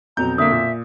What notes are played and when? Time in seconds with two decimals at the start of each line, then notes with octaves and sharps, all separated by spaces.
0.17 F2 B2 F#3 A#5 G6
0.38 D3 A#3 E5 D#6
0.52 A#2